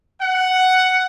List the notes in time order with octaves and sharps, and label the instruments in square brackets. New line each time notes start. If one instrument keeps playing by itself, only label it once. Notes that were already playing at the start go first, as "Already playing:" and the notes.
[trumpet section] F#5